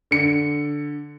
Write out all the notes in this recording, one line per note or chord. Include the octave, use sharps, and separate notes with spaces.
D3 C#7